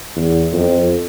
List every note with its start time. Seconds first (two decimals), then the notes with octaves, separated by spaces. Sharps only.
0.16 E2
0.53 F2